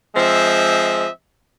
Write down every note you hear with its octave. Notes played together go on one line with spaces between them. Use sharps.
F3 G#3 C4 D#5 E5